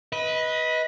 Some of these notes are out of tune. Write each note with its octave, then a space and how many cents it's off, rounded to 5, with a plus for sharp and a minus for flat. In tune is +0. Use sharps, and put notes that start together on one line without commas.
B4 -10 D#5 +25